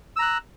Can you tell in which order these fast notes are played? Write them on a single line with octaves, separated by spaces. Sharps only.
E6 A#5 F#6